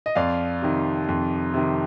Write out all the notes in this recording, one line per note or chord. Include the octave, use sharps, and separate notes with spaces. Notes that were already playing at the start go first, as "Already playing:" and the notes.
D#5
F2 D5 F5
C3 D#3
F2
C3 D#3